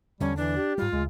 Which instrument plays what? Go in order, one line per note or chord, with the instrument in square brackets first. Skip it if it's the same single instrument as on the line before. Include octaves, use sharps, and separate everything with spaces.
[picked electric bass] E2 D3 [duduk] G3 [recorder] C#4
[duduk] E3 [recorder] D4
[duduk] G4
[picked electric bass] G#2 G3 [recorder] F4
[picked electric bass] D2 C#3 [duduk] G#3